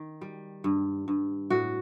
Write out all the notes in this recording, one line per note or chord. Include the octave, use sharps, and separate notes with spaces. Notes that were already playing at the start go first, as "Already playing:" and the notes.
Already playing: D#3
G3
G2
G2
A2 F#4